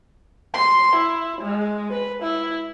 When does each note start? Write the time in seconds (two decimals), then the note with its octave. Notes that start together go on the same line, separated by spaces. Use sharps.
0.54 C6
0.96 E4
1.41 G#3
1.93 B4
2.23 E4